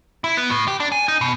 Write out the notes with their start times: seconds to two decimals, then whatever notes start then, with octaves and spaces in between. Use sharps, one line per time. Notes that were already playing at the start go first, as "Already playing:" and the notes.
0.24 E4
0.37 B3
0.50 A2
0.68 G4
0.80 D4
0.92 G#5
1.08 D#4
1.21 B2